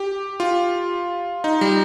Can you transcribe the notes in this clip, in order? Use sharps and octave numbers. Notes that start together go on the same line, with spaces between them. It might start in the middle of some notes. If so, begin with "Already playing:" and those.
Already playing: G4
F4
D#4
G3